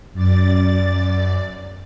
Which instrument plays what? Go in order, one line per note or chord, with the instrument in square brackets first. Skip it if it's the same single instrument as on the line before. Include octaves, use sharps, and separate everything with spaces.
[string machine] F#2 D5 A6